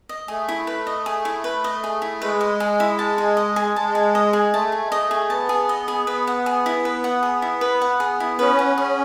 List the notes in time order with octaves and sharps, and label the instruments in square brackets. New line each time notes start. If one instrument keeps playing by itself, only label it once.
[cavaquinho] D#5
[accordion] A3 [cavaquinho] G#4
[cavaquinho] E4
B4
D#5
G#4
E4
B4
D#5
G#4
E4
[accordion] G#3 [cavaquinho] B4
[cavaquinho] D#5
G#4
E4
A5
G#4
D#5
G#4
[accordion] G#3 [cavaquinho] A5
[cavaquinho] G#4
D#5
G#4
[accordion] A3 [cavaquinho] A5
[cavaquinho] G#4
[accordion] G#3
[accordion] A3 [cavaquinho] D#5
[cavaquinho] G#4
[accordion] B3 [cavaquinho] A5
[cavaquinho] G#4
D#5
G#4
[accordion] B3 [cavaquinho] B4
[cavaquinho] F#5
G#4
E4
B4
F#5
G#4
E4
B4
F#5
G#4
E4
[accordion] C#4 [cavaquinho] B4
[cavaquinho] F#5
[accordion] C#4 [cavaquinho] G#4